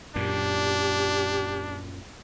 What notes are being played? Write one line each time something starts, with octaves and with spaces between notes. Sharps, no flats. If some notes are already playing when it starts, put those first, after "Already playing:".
F#2 A#2 D4 G4